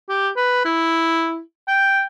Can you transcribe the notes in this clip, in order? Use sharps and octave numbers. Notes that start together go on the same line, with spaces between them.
G4
B4
E4
G5